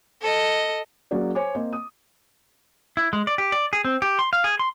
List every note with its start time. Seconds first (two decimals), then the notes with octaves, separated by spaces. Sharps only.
0.22 A4 D#5
1.11 F#3 A#3 C#4 F#4 G#4 D5
1.35 C5 C#5 G#5 D6
1.55 A#3 C4 C5 D#5
1.73 D#6
2.97 E4
3.13 G#3
3.27 D5
3.38 G4
3.52 D5
3.73 G#4
3.85 C4
4.02 G4
4.19 C6
4.33 F5
4.44 G#4
4.59 C6